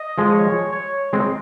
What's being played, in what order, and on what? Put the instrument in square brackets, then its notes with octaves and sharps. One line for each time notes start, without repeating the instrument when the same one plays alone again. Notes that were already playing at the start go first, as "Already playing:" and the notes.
Already playing: [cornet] D#5
[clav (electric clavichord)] F3 G#3
[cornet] C#5
C#5
[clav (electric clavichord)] G#3 C4